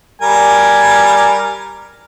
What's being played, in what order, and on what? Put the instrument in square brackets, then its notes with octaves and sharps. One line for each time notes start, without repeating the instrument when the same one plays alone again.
[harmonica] G3 A#4 G#5